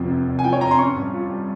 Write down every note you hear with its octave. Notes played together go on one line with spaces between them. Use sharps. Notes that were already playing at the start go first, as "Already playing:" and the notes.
Already playing: F1 F2 C3 F3
C3
F1
G#5
F3 G5
C#5
F2 A#5
C6
C#4 C#6
G2
F4
G3